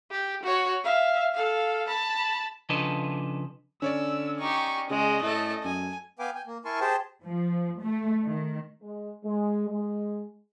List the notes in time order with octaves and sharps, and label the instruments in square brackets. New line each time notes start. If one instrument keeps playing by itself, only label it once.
[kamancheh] G4
F#4 C#5
E5 F5
A4 F5
A5 B5
[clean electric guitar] C#3 F3 D4 A4 B4 D#5
[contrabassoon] D3 [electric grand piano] C#4 C#5 D5 [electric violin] E6
[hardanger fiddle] D#4 G4 [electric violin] C#6
[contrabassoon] C#3 [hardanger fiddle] G#3 [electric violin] D#5
[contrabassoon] A2 [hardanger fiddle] A3 A4
[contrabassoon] F#2 [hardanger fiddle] G#5
[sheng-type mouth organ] B3 B4 F5 G5 G#5 D6
G5 G#5
A#3
E4 A#4 G#5 A5 C6 C#6
G4 G#4 C5 G5 A5
[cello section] F3
A3
D#3
[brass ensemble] G#3
G#3
G#3